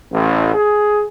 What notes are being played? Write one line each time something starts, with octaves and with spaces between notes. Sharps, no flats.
A1
G#4